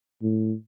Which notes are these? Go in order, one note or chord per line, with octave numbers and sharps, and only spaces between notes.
A2